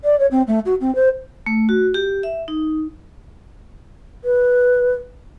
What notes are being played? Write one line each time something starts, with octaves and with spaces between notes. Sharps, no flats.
D5
C#5
C4
A3
F#4
C4
C5
A3
F#4
G4
E5
D#4
B4